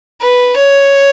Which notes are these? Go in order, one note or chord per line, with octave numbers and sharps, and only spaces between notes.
B4
C#5